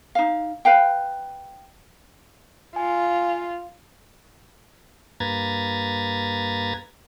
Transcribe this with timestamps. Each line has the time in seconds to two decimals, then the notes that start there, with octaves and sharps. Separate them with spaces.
0.15 D#4 F5
0.65 B4 F5 G5
2.76 F4 G#5
5.20 G2 A#3 B4 A#5 G#6 A6